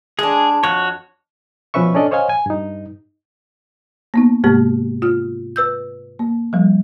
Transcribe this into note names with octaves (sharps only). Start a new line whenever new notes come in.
G#3 D4 G#4
F2 F#4 C#5
B2 F3 C#4 B4 E5 C#6
C#4 D4 A4 D5 D#5
C5 C#5 D#5 F5 G#5
G#5
G2 D#4
A#3 B3 D#4
G#2 C3 G#3 A#3 G4
F4 F6
B4 E6 G6
A#3
F3 G3